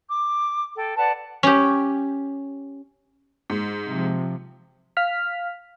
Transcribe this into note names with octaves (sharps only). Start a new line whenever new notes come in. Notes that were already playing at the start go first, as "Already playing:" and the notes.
D6
A4 G5
B4 D5 F#5 A5
C#4 G4
G#2
C3 F3
F5 F6 B6